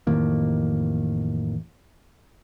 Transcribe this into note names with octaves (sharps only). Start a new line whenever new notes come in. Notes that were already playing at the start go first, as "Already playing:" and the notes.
A1 F2 D#3 A#3